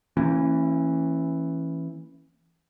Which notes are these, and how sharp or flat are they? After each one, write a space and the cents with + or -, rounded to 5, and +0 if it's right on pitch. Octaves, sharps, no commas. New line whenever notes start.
E3 +0 A#3 -40 C#4 -25